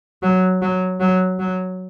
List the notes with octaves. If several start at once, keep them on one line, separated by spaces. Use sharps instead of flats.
F#3
F#3
F#3
F#3